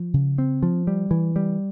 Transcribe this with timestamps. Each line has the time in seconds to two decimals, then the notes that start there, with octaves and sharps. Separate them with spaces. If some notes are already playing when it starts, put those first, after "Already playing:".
Already playing: F3
0.14 C#3
0.38 C4
0.63 F3
0.87 G3
1.11 E3
1.36 G3